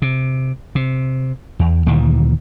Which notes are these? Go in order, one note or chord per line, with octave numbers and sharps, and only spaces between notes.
C3
C3
E2
D2 A#2 D#3 E3